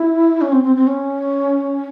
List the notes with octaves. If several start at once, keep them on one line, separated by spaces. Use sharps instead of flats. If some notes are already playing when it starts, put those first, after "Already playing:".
Already playing: E4
C#4
C4
C4
C4
C#4